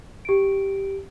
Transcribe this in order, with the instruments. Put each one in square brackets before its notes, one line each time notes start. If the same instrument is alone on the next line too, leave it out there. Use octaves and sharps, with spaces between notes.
[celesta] G4 D7